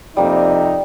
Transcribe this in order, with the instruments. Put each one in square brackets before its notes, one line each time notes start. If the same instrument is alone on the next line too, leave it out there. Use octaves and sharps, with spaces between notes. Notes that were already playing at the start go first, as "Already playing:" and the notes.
[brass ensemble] F2 C3 D#4 [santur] G3 A#3